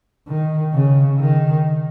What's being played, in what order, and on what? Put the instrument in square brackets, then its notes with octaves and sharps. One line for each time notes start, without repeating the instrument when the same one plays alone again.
[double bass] D#3
C#3
D#3